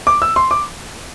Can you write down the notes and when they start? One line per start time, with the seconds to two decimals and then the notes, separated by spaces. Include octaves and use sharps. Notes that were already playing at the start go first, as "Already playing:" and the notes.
0.07 D6
0.22 E6
0.36 C6
0.51 D6